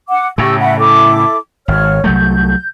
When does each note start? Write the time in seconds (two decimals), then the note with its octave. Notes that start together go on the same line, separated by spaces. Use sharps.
0.08 F#5 D6
0.38 A2 C#3 G4 C#6 E6
0.59 E5 F#5 B5
0.78 E4 A4 D6
1.68 G#1 C#5 F6
2.04 C2 F#3 A3 G6